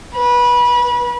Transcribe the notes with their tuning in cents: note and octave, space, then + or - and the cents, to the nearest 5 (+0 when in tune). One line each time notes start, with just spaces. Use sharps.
B4 -25